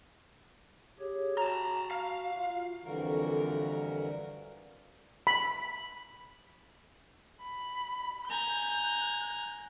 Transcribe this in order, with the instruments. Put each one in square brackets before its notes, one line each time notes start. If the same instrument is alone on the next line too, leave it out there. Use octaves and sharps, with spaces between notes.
[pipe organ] G4 G#4 C#5
[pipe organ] F#4 [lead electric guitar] A5 A#5
[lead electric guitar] F5
[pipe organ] F4
[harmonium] F2 D3 E3 G3 F#4 A#4
[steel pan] B5
[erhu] B5
[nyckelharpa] G#5 A#5 [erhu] G6